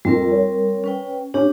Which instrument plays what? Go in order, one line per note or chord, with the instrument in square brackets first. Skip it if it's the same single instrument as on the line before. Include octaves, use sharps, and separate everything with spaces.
[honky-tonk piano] F2 [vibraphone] G3 C4 A#4
[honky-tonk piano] C#5
[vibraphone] C#4 B4 G5
[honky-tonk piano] C#4 [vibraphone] D4 G4